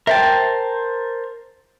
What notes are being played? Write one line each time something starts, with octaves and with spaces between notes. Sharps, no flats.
A#4 C5 E5 G5 A5